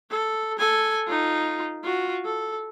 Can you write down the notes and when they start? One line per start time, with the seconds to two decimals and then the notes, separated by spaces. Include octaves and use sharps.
0.10 A4
0.59 A4 G#5
1.07 D#4 F4
1.84 F4 F#4
2.25 A4